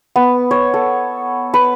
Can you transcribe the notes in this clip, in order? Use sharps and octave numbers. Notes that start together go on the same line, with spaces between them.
B3
C#5
A4
B4